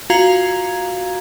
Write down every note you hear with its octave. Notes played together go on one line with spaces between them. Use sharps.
F4 F#4 F5 A#5 G#6